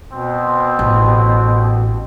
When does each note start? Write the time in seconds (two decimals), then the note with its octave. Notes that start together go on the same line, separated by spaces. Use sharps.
0.12 B2 C4
0.79 A1